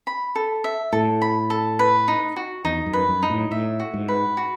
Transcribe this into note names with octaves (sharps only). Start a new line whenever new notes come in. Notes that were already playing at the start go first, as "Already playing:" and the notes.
B5
A4
E5
A2 A4
B5
A4
B4
D#4
F#4
E2 D#4
F#2
B4
F#2
D#4
A2
A2 E5
F#4
G#2
B4
F#4